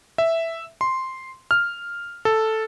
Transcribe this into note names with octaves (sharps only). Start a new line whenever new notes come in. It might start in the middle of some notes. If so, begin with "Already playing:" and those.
E5
C6
F6
A4